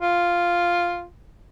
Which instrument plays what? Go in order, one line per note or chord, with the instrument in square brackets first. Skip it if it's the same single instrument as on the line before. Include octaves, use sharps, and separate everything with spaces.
[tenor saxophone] F4